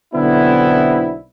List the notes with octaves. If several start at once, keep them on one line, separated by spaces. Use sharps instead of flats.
B1 D3 B3 C4 D4 E4